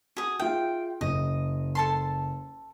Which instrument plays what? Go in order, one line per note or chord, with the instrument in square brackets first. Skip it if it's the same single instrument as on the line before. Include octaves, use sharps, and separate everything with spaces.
[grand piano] F#4 [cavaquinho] G#4 D#6
[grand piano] F4 G#4 E5 [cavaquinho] G5
[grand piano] F#1 [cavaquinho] D#5
[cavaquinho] A4 A5 C6